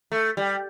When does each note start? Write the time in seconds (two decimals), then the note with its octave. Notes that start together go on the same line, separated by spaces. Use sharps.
0.12 A3
0.37 G3